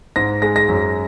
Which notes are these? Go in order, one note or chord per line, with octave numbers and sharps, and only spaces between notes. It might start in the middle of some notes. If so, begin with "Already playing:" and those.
G#2 A#6
G#3 A#6
A#6
F#2